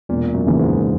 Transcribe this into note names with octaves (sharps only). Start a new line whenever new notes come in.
E1 A#2
F#2
D#2 C#3 E3
G#2